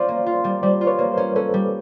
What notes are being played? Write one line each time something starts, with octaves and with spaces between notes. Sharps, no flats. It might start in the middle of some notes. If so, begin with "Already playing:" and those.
Already playing: C#4 F4 C5 D5
A#3
F4
G3
G3 C5 D5
F4
B4 C#5
A#3
A#4 C5
C#4
C#4 A4 B4
G3